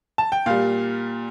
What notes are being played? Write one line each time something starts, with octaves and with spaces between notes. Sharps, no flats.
A5
G5
A#2 G3 F5